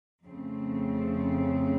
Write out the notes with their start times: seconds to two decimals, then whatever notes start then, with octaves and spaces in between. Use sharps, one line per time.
0.24 F2 C#3 A3 C4